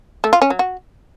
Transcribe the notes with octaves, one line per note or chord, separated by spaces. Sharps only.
A3
F4
C#4
F#3
F#4